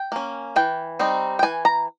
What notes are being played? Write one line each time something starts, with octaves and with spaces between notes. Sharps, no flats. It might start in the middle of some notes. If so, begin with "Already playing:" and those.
Already playing: G5
A#3 C#4
E3 G5
G3 C4 D#4
G5
E3 G#5
A#5